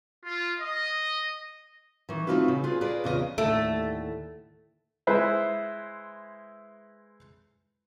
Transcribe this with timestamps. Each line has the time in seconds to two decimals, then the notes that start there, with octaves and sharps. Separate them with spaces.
0.25 F4
0.59 D#5
2.09 D#3 E3
2.27 A3 C4 D#4 F4 F#4 B4
2.48 C#3
2.64 F4 G#4 B4
2.81 F4 G#4 A#4 B4 D5
3.04 E2 C#3 F4 A4 D#5
3.38 D#2 A2 D3 A3
5.07 G#3 E4 B4 C5 E5